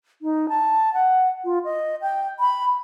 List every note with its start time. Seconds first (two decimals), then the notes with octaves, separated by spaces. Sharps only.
0.22 D#4
0.49 A5
0.94 F#5
1.45 F4
1.65 D#5
2.02 G5
2.40 B5